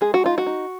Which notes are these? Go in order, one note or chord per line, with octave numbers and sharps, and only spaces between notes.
G#3 G#4
F#4
D#4 F4
F#4
D#4